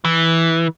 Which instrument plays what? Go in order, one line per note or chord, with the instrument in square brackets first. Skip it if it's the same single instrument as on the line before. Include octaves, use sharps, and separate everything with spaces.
[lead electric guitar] E3